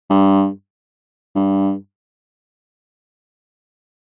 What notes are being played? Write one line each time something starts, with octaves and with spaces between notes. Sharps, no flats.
G2
G2